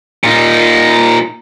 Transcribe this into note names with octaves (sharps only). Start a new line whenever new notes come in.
A#2 D#4